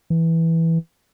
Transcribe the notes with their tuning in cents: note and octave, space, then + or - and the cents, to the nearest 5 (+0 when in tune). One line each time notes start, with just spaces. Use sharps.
E3 -5